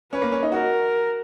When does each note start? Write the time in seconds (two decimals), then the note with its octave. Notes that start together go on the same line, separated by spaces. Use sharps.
0.13 C#4 B4
0.22 A#3
0.32 C#4
0.43 D#4
0.52 F#4 A#4